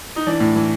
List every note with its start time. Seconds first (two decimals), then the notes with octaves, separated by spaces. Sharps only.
0.16 D#4
0.27 E3 D4
0.40 A2
0.55 E3